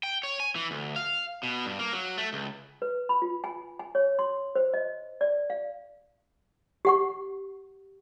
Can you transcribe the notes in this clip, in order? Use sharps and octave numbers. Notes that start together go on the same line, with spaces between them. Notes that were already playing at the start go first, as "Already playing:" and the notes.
G5
C#5
G#5
E3
D2
F5
B2
G2
A#3
F#3
A3
C#2
B4
B5
F4
G#5
G#5
C#5
C6
C5
D#5
D5
F5
G4 F#5 C#6